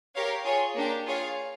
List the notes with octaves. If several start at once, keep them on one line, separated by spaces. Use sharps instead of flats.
G4 A#4 C#5 F5
F4 G#4 C#5
A#3 D4 G4
F4 G#4 C#5 F5